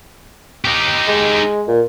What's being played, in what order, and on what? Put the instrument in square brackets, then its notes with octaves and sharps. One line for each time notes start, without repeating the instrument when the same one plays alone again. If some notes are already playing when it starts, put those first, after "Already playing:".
[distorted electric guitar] D#4 G4
[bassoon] G#3
A#2